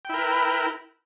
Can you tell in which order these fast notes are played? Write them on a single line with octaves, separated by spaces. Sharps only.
G5 E4 A#4 B4